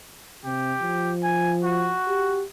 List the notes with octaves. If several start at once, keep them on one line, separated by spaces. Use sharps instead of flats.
C3 G4
F3
G#5
F#4
G4